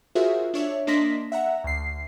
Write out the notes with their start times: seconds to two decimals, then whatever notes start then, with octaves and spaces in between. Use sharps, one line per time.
0.15 F4 F#4 G#4 A#4 C5 E5
0.54 D4 C#5 E5
0.87 A#3 D4 D#5 C6 A#6 B6
1.32 E5 F#5 A#5
1.64 D2 C7